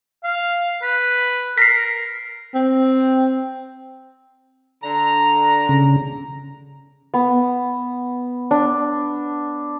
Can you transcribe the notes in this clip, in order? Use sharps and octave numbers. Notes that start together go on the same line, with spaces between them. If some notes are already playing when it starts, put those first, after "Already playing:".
F5
B4
A#4 B6 C7
C4
D3 A#5
C#3
B3
D4